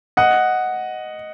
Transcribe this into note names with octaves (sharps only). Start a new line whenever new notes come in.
D#5 F#5